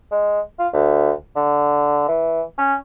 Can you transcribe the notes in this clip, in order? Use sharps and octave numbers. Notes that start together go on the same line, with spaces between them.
G#3
F4
D2
D3
E3
C#4